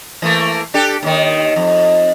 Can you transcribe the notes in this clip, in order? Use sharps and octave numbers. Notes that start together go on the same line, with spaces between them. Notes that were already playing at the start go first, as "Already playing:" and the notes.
E3 A3 A#3
D4 G4 A4
D#2 D#3
F2